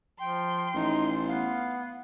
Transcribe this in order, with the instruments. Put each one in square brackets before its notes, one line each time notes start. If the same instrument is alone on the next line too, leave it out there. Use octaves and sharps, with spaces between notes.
[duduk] F3 [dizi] G5 [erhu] C6
[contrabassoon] A1 [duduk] D#4
[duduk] B3 [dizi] F5